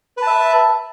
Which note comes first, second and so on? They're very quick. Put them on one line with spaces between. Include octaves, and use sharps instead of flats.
B4 A5 E5